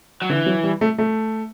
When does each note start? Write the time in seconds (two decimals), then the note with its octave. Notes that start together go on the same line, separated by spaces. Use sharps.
0.22 F#3
0.29 D3 E3
0.46 F#3
0.64 G3
0.81 A3
0.98 A3